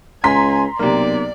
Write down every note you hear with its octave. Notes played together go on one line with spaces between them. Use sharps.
C#2 G#5 A#5 C6 B6
B1 C3 A#3 D5